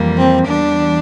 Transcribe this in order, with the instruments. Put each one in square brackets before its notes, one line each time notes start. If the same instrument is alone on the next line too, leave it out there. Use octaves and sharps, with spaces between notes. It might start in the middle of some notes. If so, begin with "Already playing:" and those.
Already playing: [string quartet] F2 E3 G3 A#3
C4
E2 E3 G3 D4